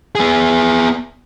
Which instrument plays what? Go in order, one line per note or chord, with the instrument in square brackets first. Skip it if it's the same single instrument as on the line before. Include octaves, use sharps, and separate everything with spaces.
[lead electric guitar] B3 G#4